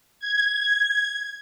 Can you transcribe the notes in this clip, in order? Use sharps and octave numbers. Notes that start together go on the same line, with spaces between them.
G#6